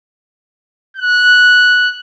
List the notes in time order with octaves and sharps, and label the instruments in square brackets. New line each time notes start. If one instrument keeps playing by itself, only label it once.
[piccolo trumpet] F#6